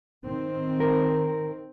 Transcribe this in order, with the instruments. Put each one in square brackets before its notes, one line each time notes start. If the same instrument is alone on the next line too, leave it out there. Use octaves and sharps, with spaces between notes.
[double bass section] D#3 C4
[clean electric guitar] A#4